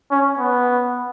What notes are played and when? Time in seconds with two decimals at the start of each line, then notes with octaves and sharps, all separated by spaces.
0.11 C#4
0.39 B3